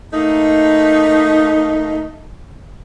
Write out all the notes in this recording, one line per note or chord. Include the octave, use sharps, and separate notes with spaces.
A3 A#3 D#4